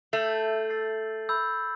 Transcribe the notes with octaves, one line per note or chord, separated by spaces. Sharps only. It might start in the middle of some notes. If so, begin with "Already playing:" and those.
A3 E6 G6 C7 F#7
E6 A6 C7
B5 E6 G6